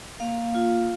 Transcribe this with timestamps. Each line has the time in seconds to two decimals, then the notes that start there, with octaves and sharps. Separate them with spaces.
0.20 A#3 F5
0.55 F4